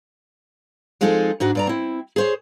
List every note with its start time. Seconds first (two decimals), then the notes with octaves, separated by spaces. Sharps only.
1.01 F3 G#3 C4 D#4 G#4 A4
1.40 G#2 D4 F#4
1.55 G2 D5 A#5
1.67 C4 E4
2.16 G#4 C5 C#5